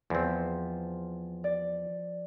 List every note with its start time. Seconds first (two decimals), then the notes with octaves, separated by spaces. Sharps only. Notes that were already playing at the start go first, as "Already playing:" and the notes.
0.10 E2 F3 C4
1.44 D5